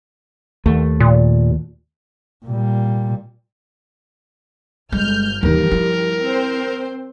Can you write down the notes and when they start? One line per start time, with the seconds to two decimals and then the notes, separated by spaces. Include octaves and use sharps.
0.66 D#2 A3
1.00 A#2
2.46 A#2 G3
4.92 G1 G#3 F6 G6
5.43 D#2 E3 F3 G3 A#4
5.71 E4
6.22 C4 C5